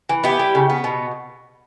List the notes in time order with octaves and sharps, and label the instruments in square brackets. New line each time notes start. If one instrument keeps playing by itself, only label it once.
[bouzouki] E3
B3 E4 G4
G3
C#3
B3
B2